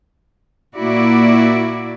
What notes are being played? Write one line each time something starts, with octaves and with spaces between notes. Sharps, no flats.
A#2 A#3 E4 F#4 D5